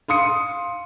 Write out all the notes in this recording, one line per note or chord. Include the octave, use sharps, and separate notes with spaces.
F5 C6 D#6 C#7